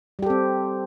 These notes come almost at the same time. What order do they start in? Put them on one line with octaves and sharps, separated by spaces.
G3 G4 A4 C4